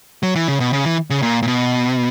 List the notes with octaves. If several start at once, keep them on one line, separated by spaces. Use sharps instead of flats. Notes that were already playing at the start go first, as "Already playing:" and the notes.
F#3
E3
C#3
B2
C#3
E3
C#3
A#2
A#2
B2